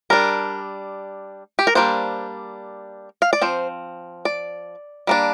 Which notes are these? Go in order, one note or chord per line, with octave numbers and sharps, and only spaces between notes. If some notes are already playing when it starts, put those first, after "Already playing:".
G3 D4 A#4
G4
A#4
G3 A#3 D4 C5
F5
D5
F3 C4 C5
D5
G3 A#3 D4